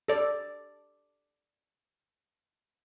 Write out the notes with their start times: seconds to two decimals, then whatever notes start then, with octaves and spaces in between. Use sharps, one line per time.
0.08 A4 D5